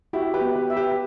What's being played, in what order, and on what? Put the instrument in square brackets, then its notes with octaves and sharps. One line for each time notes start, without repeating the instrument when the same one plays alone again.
[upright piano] E4 G4 [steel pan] F#4
[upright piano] G4 B4
[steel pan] B3
[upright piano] G4 B4
[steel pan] E5
[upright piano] G4 B4